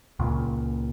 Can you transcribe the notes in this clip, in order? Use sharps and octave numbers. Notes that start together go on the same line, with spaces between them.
C#2 A#2